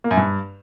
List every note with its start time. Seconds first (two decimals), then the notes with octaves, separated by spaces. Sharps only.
0.04 A#3
0.11 F#2
0.17 G2